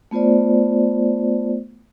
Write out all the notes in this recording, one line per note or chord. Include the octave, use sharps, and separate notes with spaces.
A3 B3 F4 C5 D5